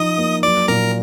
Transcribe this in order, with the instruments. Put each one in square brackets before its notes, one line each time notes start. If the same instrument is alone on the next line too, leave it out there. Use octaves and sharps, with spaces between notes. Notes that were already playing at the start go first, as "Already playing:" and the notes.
Already playing: [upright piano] F3 D#4 [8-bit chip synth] D#5 D#6
[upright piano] A#3
[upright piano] F#3 [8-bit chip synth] D5 D6
[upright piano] A#2 [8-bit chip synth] A#4 A#5